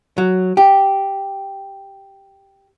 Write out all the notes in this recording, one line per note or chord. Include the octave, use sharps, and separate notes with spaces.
F#3
G4